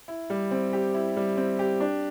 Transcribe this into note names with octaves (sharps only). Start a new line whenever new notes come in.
E4
G3
C4
G4
E4
G3
C4
G4
D4